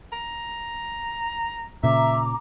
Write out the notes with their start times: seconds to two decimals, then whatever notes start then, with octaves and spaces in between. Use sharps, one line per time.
0.13 A#5
1.83 A#2 C#3 E5 A#5 D6